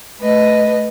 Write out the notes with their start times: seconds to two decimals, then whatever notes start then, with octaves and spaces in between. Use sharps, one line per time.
0.20 A3 B4 D#5